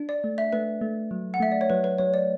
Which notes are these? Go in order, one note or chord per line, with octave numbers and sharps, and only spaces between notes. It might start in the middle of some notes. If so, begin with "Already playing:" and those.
Already playing: D4
D5
A3
E5
A3 B4
A3
F#3
F#5
A3 E5
D5
C#5
F#3 B4
B4
F#3 C#5
D5